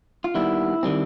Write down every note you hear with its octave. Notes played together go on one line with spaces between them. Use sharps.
F4
D#2 D#3 G3 B3 E4
D#3 G3 C4